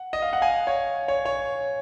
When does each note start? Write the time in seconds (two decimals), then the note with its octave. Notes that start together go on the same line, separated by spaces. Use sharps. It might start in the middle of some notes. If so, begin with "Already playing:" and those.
Already playing: F#5
0.13 D#5
0.22 F5
0.33 F#5
0.42 F5 G#5
0.67 C#5
1.08 C#5
1.26 C#5